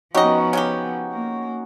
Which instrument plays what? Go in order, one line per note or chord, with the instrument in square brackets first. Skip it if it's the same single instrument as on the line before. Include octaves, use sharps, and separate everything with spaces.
[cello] F3 B3 [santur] C#4 D#4 F#4 [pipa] G4 D#5
[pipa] C#3 F#3 G4
[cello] A#3